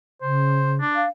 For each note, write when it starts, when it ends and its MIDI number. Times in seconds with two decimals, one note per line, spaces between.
0.22 0.80 49
0.22 0.73 72
0.80 1.04 62
0.96 1.09 77